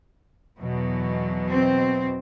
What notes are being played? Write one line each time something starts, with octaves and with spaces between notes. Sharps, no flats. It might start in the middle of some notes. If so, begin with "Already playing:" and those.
E2 B2 F#3
C4